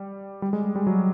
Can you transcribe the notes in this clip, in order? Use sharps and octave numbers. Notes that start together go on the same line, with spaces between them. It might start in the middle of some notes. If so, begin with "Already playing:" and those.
Already playing: G3
G3
G#3
G3
F#3